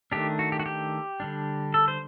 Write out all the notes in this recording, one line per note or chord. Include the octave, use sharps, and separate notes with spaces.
D#3 A3 D4 G4
F#4
G4
F#4
G4
D3 G3 D4
A4
C5